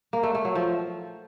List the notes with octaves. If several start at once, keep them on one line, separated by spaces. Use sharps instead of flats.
A#3
A3
A3
F#3
F3